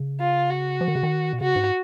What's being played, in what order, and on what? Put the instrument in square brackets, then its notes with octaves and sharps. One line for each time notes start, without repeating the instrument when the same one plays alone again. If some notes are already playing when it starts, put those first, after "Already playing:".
Already playing: [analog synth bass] C#3
[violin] F4
F#4
[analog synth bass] F3
D#3
C#3
D#3
B2
[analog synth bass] C#3 [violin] F#4
[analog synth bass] G#2